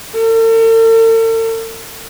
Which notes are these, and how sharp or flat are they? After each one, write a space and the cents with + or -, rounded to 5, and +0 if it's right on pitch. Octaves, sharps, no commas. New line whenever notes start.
A4 +45